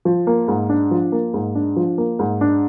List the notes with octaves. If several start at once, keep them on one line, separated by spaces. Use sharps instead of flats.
F3
A#3
G#2
D4
F3
A#3
G#2
D4
F3
A#3
G#2
D4